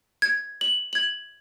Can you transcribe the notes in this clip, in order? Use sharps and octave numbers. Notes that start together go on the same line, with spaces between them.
G#6
F#7
G#6 F#7